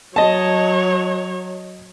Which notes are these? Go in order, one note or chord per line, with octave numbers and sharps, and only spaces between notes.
F#3 C#5 D#5 A5